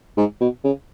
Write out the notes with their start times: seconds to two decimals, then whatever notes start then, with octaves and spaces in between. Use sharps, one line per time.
0.18 G#2
0.41 B2
0.64 C#3